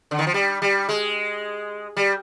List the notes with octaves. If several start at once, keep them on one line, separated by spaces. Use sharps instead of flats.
D3
D#3
F3
G3
G3
G#3
G3